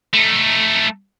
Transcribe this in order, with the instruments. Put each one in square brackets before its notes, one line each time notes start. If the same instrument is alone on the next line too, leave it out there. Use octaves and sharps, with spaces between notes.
[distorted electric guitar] A3 D#4